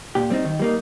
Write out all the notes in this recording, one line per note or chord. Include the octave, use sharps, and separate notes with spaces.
A#2 G4
G3 C4 D#4
D#3
G3 A#3 D#4